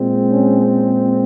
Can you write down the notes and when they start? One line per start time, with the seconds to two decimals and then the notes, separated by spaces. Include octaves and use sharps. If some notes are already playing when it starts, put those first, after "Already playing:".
Already playing: A#2 G#3 C4
0.29 C#4